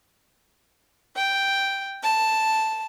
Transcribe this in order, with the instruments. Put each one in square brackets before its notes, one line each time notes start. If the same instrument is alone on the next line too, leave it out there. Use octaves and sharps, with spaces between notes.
[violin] G5
A5